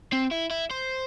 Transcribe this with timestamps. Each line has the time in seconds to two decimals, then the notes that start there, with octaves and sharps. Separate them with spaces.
0.12 C4
0.31 E4
0.50 E4
0.70 C5